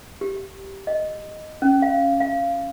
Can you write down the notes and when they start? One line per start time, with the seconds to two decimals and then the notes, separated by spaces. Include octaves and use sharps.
0.21 G4
0.87 D#5
1.62 C#4
1.82 F5
2.20 F5